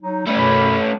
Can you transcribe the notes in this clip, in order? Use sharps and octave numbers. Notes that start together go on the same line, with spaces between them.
F#3 D#4
G3 A3 C#4
F#2 B2 B5